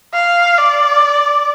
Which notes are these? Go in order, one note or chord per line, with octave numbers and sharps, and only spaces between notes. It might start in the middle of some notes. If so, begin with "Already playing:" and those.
F5
D5